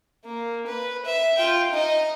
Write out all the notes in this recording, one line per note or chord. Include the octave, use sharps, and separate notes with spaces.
A#3
B4
E5
F4 G5
D#4 D#5